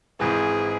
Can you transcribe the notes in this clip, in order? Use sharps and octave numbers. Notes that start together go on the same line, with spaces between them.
G#1 G#2 E3 G#4